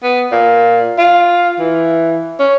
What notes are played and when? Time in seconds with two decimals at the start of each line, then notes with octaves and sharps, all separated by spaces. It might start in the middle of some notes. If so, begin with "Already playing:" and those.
0.03 B3
0.32 A#2
0.98 F4
1.59 E3
2.40 C#4